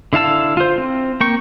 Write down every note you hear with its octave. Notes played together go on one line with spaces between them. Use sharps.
D3 E4 F5 A5 E6
F4 C5
C4
A#3 G5 C#6